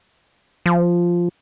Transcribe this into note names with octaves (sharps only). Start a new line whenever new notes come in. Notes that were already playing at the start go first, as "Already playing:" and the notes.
F3